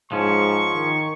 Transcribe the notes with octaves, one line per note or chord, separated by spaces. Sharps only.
G#2 F3 C#4 C#6
D#3